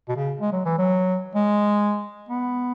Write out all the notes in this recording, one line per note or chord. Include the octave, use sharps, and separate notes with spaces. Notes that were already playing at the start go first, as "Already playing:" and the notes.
B2
C#3
G#3
F#3
E3
F#3
G#3
B3